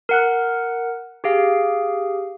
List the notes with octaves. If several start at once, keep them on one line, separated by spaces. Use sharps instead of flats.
A#4 F#5 F#6
G4 G#4 F5